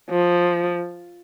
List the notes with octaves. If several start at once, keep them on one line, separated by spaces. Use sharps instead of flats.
F3